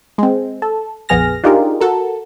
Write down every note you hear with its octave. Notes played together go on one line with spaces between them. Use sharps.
G#3 C4
A4
A#1 F2 B3 G#4 F6 A#6
D4 D#4 F4 G4 G#4 A#4
F#4 A4 A#4